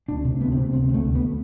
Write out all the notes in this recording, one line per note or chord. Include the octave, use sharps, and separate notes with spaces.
D2 D4
C3
D2 B3
C4
C3
D2 C4
D2 A3
D2
B3